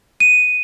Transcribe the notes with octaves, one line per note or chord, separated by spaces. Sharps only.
D#7